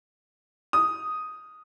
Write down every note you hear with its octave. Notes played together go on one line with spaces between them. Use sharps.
D#6